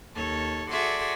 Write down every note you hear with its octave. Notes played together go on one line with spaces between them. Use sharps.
D#2 A4 C#5 A5
F#4 G#4 A4 D5 E5 C6